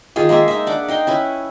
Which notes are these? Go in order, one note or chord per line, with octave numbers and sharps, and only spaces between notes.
D#3 F4 G4 G#4
G#3 A#3 G#4 E5
D#4 E5
D4 F#5 D6
D#4 G5 C6
C#4 E4 B4